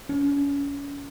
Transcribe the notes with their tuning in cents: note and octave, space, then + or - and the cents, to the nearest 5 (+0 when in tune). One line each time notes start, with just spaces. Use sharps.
C#4 +30